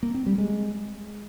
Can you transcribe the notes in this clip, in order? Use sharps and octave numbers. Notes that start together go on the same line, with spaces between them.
A#3
C4
G3
G#3